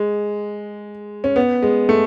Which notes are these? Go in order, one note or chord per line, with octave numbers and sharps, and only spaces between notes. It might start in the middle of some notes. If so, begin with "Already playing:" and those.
Already playing: G#3
C#4
B3
G#3
A3